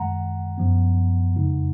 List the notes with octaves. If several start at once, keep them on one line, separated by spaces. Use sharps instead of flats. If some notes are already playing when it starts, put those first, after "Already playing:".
Already playing: F#2 D#3 G#3 F#5 A#5
F#2 F3 B3
F2 C#3 G#3 D#4